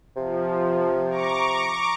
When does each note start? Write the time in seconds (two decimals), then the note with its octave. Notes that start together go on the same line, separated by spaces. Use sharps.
0.16 C3 F3
1.10 A#5 C#6 D6